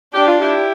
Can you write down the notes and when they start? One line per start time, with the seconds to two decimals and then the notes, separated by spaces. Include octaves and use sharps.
0.14 D4 G4
0.27 F4
0.40 E4 G4